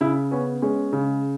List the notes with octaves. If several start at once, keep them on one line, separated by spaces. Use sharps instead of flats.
C#3 E4
B3 C#4
G#3 C#4
C#3